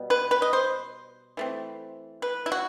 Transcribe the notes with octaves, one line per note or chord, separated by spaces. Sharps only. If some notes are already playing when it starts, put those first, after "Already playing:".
Already playing: B2 G3 B3
B4
B4
D#5
C5
E3 A3 C4
B4
E4
F#4